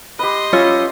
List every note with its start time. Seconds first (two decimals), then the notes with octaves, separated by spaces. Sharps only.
0.19 G4 B4 D#5 C6
0.53 C#4 F4 C#5 E5